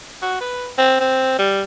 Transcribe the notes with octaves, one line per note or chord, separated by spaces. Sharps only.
F#4
B4
C4
C4
G3